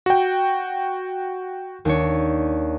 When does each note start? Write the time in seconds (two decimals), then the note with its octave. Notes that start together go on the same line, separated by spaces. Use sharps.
0.06 F#4 G5
1.85 D#2 D4 C#5